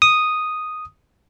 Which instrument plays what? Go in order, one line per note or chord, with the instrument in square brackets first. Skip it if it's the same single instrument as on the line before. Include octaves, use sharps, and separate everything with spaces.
[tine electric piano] D#6